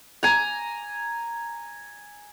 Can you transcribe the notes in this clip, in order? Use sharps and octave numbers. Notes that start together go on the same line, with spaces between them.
G#5 A#5